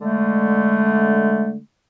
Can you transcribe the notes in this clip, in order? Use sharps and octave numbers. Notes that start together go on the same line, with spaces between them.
D3 G#3 A3